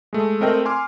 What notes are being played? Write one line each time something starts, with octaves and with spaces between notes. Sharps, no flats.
G#3 A3
A3 C4 A#4 D#5 G5
G#5 C6 D6 F6